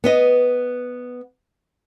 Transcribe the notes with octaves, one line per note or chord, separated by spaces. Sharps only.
B3 B4 D#5